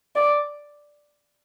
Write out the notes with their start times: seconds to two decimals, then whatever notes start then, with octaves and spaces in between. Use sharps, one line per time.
0.15 D5